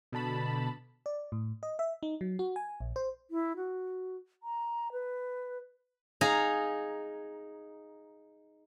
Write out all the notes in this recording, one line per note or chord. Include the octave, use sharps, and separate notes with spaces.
B2 D3 A5 B5
D5
A2
D#5
E5
D#4
F#3
F#4
G#5
A#1
C5
E4
F#4
A#5
B4
D#4 G#4 F5 A#5